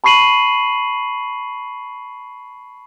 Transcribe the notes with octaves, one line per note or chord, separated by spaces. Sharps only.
A5 B5 C#6 C7 D#7 F#7